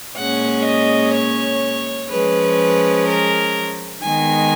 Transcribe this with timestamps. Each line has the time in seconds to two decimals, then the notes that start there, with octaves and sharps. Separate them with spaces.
0.19 A#2 G#3 C#4 F#5
0.66 D#5
1.15 C#5
2.11 F3 G#3 C#4 B4
3.07 A#4
4.03 D#3 G#3 B3 G#5